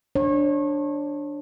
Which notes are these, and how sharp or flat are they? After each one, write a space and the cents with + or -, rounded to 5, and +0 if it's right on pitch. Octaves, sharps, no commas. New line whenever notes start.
D4 +0 C#5 -30